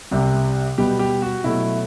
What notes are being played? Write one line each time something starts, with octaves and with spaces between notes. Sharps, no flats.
C2 C3 G3
B2 G3 B3 G4
G4
F#4
B2 F#3 A3 E4